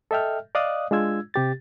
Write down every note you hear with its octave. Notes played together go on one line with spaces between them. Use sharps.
A4 D#5 E5 G5 F6
D5 D#5 F5 D#6 F#6
G#3 D4 F4 E6 G#6
C3 G4 A6